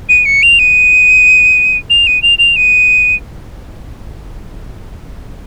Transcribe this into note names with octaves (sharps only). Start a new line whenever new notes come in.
D#7
C#7
F7
D#7
F7
D#7
F7
F7
D#7